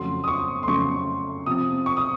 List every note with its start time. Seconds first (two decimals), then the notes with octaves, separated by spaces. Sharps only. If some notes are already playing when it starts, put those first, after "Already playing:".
Already playing: F2 C#3 F#3 A3 C6
0.24 D#6
0.28 C#6
0.63 C6
0.67 F2 C#3 F#3 A3 C#6
1.46 C3 F3 C4 D#6
1.86 C#6
1.97 D#6